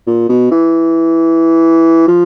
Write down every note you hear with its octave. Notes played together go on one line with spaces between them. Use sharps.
A#2
B2
E3
F3